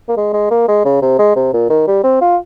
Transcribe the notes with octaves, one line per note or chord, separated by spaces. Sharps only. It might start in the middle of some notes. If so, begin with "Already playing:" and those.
A#3
G#3
G#3
A#3
G#3
C#3
C3
G#3
C3
A#2
D#3
G3
C4
F4